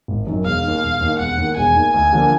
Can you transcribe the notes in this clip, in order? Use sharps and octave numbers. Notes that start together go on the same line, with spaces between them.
G#1
F#2 D#3
E1 F5
D#2 D#3
E1
D#2 D#3
E1 F#5
D#2 D#3
E1 G#5
D#2 D#3
D2 G#5
D3 F3 A#3